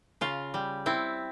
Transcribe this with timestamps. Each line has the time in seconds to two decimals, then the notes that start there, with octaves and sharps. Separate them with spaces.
0.21 C#3 F4
0.54 G3
0.86 C4 E4